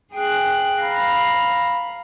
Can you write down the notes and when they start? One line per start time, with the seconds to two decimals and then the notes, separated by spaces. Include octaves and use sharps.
0.13 G#4 G5 F#6
0.81 F5 A#5 B5